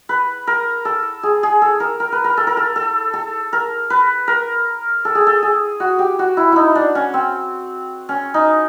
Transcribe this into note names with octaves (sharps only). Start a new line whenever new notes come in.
B4
A#4
A4
G#4
G#4
A4
A#4
A#4
B4
A#4
A4
A#4
A4
A4
A4
A#4
B4
A#4
A4
G#4
A4
G#4
F#4
G4
F#4
E4
D#4 E4
D4
C#4
C4
C#4
D#4